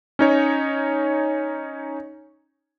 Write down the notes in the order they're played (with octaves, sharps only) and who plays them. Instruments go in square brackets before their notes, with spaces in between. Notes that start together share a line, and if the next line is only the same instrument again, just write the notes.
[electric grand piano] C#4 D#4 C#5